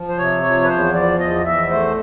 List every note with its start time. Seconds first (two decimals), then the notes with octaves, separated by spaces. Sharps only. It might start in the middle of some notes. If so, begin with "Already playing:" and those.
Already playing: F3
0.08 C5
0.17 C3 C#5
0.43 F3 C#5
0.62 B4
0.68 E2 C5
0.94 F3 D5
1.19 E2 D#5
1.45 E2 E5
1.70 A3 C5